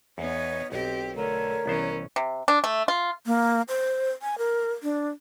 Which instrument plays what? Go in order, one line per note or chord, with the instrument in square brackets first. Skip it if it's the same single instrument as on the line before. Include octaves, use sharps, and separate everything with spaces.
[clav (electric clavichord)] E2 [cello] B3 D#4 [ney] C#5
[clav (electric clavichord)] B1 [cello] C4 G4 [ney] D#5
[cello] D3 A3 [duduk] A#4 [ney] C#5
[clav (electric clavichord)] C2 B3 C5 [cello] E3 C#4
[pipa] C3
D4
A3
F4
[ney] A#3
C5
G#5
A#4
D4